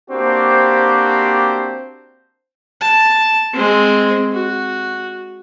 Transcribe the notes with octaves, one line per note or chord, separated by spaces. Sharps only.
A#3 C4 D4 F#4 G4 C5
A5
G#3 C4
F#4